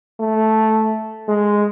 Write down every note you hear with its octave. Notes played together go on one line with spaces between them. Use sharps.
A3
G#3